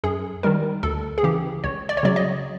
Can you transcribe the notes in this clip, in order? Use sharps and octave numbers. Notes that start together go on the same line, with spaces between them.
F#2 G#4
D#3 G3 A#4
D2 A4
G#4
C#3 E3 G4
C#2 C#5
D5
C#5
C#3 F#3 D5
D#5